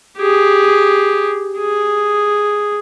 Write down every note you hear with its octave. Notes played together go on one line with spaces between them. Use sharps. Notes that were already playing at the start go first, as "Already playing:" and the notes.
G4 G#4
G#4